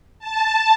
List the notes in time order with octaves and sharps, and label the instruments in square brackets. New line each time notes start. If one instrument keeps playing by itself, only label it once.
[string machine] A5